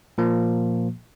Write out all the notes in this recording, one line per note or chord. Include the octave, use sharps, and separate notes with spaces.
A#2 F3 A#3